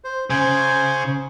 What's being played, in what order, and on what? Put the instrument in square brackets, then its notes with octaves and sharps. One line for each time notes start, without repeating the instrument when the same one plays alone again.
[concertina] C5
[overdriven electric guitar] C#3 [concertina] C5 G#5